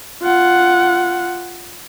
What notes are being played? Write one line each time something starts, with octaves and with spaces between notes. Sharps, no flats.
F4 F#5